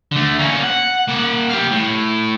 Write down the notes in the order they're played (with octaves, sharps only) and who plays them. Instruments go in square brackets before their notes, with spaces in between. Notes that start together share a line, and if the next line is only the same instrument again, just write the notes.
[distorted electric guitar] D3 A3
A#3 C#4
F#5
A#3 F#5
G4 F5
A2